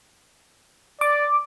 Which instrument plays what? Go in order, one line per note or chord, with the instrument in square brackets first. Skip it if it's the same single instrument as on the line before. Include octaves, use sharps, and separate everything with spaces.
[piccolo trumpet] D5 [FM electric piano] D6